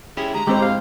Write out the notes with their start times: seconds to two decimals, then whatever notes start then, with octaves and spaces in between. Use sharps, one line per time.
0.17 C#4 E4 G4 G#4
0.34 D3 G#3 A#5
0.47 A2 D3 G#3 C4 G4 C5
0.62 F5